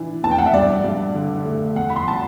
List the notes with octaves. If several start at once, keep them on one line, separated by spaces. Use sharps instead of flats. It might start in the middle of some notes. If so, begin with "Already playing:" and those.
Already playing: E3 D4
B3 A5
G5
F#5
E5
G2 D5
G2
D3
A3
E2 F#5
B5
C6
A5